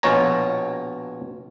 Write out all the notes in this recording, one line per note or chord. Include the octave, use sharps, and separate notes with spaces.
A#1 B2 F4 C#5 G#5 A#5